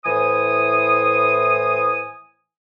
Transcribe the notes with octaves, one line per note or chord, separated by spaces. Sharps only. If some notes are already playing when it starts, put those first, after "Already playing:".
A2 E3 C5 G#5 D#6